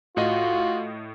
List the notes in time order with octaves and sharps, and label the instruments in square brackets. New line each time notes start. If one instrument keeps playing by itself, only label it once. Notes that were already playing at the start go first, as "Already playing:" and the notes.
[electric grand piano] A2 D#5 [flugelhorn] F4 [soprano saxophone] F#4